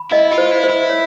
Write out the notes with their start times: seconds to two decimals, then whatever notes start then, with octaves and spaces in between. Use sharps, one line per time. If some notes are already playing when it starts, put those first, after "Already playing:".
Already playing: B5
0.12 E4 D#5
0.32 F4
0.38 C5
0.51 E4
0.64 C5
0.70 E4
0.90 C#5